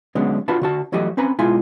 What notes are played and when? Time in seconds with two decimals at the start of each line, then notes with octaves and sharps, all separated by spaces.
0.15 D3 F#3 G#3 B3 C#4 D4
0.48 D4 F4 F#4 B4 A5 B5
0.62 D3 F#4 A5
0.92 E3 F#3 A3 F#4 G4 D#5
1.17 C4 C#4 B4 G#5 A#5 B5
1.39 B1 G#3 E4 F4 E5 G#5